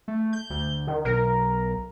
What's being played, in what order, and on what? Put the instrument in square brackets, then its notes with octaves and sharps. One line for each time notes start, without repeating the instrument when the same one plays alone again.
[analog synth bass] A3
[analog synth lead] G6
[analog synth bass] D2
[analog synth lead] D#3
[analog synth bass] B1 [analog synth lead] A#4